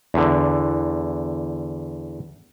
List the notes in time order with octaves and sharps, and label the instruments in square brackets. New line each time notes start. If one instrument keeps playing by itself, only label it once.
[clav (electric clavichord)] E2 D3